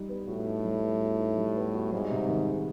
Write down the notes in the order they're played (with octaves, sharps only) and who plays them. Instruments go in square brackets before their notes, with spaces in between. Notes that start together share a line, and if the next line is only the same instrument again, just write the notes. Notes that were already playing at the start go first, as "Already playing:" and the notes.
Already playing: [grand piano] G3 D#4
B3
[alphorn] A2 [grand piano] F#4
[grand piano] D#4
G3
B3
F#4
D#4
G3
B3
F#4
[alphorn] G#2 [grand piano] G3
[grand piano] C3
D#3
C3